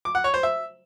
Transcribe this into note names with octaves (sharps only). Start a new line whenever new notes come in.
D6
F#5
C#5
C5
E5